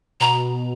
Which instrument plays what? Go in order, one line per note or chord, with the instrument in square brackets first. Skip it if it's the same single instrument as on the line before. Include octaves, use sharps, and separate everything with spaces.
[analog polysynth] B2 [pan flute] A#5